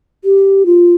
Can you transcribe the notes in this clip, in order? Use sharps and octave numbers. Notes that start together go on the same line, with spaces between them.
G4
F4